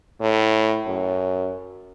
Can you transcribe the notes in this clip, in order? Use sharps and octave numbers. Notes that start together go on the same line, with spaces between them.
A2
F#2